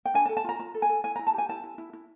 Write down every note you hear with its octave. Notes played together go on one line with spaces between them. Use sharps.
G5
D4 G#5
A5
A4
A5
F4 A#5
F4 A#5
A4
G#5
A4
E4 G#5
E4 A#5
A5
G4 G#5
E4 A5
E4
E4
E4